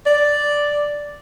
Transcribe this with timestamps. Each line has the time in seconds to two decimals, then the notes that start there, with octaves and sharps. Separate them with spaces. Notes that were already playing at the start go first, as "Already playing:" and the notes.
0.06 D5